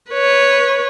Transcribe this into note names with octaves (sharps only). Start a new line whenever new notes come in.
B4 C#5